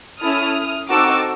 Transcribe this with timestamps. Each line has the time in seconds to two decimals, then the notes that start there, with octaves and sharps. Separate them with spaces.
0.20 C#4 E4 A4 D#6 F6
0.88 C4 D#4 F#4 A4 D6 E6